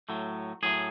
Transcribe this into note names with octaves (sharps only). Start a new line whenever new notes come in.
A2 F#3 A3
A2 F#3 A3 G#4